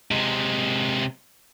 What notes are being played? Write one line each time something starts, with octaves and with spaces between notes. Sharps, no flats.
C3 G#3